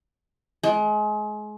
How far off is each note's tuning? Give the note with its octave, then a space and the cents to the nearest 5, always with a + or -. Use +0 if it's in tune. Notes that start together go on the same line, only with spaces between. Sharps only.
G#3 +30